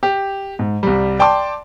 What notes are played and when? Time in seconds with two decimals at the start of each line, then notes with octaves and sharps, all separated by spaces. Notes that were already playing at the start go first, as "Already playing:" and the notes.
0.03 G4
0.59 G#2
0.83 C2 G3
1.19 D5 G5 A5 C6 D6